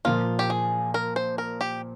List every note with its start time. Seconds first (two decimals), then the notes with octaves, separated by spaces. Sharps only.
0.05 A#2 F3 A#3 F4
0.39 G4
0.50 G#4
0.94 A#4
1.16 C5
1.38 A#4
1.61 G4